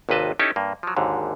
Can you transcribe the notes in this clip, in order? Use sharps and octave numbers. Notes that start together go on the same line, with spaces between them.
G#1 D#2 C3 B4 D#5 A5
C#4 D#4 E4 G4 A4
G2 A#3
F3 F#3
G#1 D#2 G#2 D3